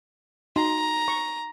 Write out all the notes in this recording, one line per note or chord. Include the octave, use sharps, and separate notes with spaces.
D#4 F#4 A#5 C6
C#6